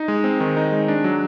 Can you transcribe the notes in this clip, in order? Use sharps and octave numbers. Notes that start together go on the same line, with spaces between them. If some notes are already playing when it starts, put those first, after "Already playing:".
Already playing: D#4
G#3
C4
D#3
D#4
G#3
D4
F#3